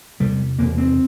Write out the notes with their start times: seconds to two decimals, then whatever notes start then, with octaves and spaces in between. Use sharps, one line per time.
0.20 E2 C3 G3
0.58 E2 C3 A#3
0.78 C4